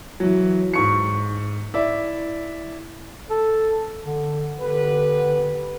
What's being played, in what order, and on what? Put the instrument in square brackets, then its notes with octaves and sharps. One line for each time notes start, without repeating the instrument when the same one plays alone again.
[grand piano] E3 F#3
G#2 C#6 C#7
E4 D5 E5
[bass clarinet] A4
D3
[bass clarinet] D3 [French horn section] B3 G4 B4